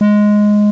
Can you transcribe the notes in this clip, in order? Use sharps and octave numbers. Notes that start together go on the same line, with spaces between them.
G#3